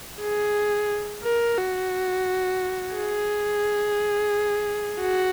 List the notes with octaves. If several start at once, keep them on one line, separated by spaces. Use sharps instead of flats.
G#4
A#4
F#4
G#4
F#4